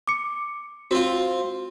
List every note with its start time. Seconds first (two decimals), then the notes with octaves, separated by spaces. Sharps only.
0.07 D6 C#7
0.91 C4 F4 F#4